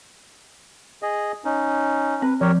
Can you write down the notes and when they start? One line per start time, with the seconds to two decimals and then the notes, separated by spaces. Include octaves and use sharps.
1.02 G#4 D#5
1.45 C#4 D#4
2.22 C4 B4
2.41 F3 G4 A#4 C#5